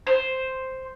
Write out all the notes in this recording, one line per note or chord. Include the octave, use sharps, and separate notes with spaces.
C5